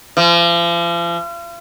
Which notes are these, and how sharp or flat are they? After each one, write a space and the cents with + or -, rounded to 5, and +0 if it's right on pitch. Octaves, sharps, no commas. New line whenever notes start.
F3 -40